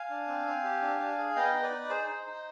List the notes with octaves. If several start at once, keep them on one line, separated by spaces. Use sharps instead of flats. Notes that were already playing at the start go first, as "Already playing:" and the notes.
Already playing: F5 G#5
D4
C4
C4
G4
D4
D4
G#4
B3 D#5 G5
D#4
B4 D5
D#4
G#4 C5
D#4
D#4